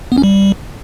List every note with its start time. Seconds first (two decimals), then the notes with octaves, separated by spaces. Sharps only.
0.12 B3
0.18 C#4
0.23 G3